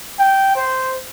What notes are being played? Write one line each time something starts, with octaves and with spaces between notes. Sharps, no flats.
G5
C5